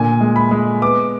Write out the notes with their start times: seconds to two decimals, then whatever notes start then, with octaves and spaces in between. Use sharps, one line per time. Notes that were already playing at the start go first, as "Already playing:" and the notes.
Already playing: A#2 D3 G#5
0.21 G#3
0.36 B5
0.51 G#3
0.82 B3 D6